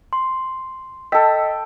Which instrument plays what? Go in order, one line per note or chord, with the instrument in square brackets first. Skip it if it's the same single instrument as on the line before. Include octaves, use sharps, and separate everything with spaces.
[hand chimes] C6
[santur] A4 G5 [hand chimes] D#5 E6 B6